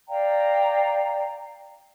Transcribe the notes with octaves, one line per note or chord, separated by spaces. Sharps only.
D5 F5 G5 A#5